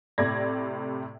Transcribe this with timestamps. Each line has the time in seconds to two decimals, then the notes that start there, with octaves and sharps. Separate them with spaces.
0.18 A2 C3 D5 G#6 A#6